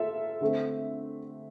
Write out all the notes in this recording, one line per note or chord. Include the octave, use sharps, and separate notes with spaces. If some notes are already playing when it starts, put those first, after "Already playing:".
Already playing: F4 A4 E5
D3 A3 C4